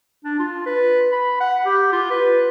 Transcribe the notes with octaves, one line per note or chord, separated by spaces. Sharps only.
D4
F4
B4
B5
F#5
G4
F4
B4